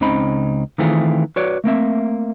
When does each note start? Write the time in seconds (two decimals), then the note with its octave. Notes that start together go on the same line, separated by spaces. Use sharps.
0.01 C#2 C#3 C4 D#4 B5
0.78 D#3 E3 A3 C4 F4 G#4
1.36 F#4 B4 C#5 D5
1.64 A3 A#3 C4 E5